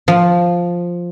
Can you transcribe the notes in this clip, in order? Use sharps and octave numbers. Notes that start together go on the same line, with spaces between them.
F3